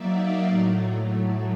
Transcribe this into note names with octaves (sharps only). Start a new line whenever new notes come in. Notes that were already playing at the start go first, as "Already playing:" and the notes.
Already playing: F#3 A#3 D#4 D5 E5
D#5 F5
A2 F#3 A3